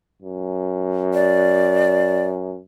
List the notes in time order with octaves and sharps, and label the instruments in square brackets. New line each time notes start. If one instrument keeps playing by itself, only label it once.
[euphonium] F#2
[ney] D5